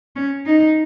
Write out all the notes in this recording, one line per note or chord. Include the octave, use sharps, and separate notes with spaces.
C#4
D#4